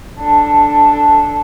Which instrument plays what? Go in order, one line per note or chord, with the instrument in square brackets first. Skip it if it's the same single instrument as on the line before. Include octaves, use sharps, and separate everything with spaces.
[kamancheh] D4 A4